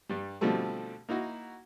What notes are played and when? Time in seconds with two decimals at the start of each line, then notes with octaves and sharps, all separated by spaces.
0.09 G2 G3
0.41 B2 D3 F3 G3 A3 C4
1.09 A#3 D#4 E4 F#4